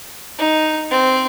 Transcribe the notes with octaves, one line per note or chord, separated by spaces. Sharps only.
D#4
C4